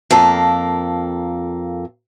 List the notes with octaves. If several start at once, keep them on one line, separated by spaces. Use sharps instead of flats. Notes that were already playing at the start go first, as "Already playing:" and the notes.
F2 A#3 A4 A#4